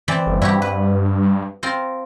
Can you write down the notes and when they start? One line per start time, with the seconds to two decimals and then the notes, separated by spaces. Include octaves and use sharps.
0.08 E3 C4 D5
0.27 G1
0.42 G2 E4 F#4 G4
0.62 B4
1.63 C4 F4 A#4